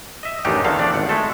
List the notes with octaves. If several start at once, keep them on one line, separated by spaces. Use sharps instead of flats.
D#5 E5
A1 F#2 D#3 D4 D#4 G4
E2 A2 D3 D#3 A4 F5
F3 A3 D4 D5
G#1 F#5
G#3 A3 A4